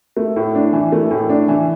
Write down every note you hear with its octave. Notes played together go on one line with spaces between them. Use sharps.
A3
A2
D4
E3
A3
A2
D4
E3